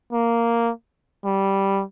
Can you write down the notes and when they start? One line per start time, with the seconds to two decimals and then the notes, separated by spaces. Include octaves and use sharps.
0.13 A#3
1.25 G3